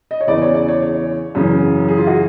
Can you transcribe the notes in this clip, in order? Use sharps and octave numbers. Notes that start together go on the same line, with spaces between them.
D#5
C#5
E2 C#3 E3 D5
C#5
D5
C#5
C#5
F#2 C#3 E3
G#4
F4
F#4